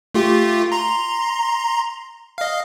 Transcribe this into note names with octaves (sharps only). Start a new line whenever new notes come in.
A3 F4 G4
A#5 C6
D#5 F5